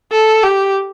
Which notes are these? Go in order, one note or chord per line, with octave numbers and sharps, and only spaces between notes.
A4
G4